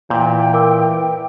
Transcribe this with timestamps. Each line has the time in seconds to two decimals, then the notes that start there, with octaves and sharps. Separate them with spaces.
0.10 A#2 E3 G5 G6
0.54 A#4 D6 E6